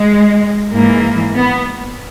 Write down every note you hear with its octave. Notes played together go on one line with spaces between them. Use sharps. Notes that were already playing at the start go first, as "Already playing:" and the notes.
Already playing: G#3
G#2 E3 G#3 A#3
B3